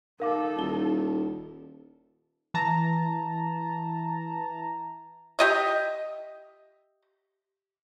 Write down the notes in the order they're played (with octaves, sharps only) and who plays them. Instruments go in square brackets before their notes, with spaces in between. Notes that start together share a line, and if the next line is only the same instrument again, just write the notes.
[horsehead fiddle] D#4 A4 [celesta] A#4 F5 D6
[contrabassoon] D#1 [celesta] E4 G7
[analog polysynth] E3 A5 A#5
[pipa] G4 D#5 E5